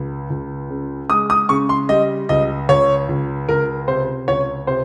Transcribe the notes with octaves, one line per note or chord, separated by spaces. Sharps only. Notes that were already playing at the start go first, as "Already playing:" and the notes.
Already playing: C#2
C#2
C#3
G#3 D#6
D#6
C#3 C#6
C6
G3 D#5
C#2 D#5
C#2 C#5
C#2
C#2 A#4
C3 C5
C#2 C#5
C3 C5